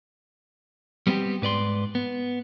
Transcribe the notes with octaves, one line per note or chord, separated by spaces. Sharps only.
G3 B3 C4 E4 G4
G#2 B4 D5 C6
B3